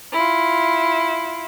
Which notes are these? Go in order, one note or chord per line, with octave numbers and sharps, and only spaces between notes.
E4 F4